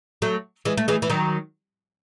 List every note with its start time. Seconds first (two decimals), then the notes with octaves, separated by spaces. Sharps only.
0.22 F#3 A3
0.65 E3 G#3
0.77 A3
0.88 E3 G#3
1.02 E3
1.10 D#3 F#3